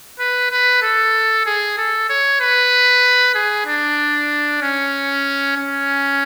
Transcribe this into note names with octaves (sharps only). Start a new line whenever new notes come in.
B4
B4
A4
G#4
A4
C#5
B4
G#4
D4
C#4
C#4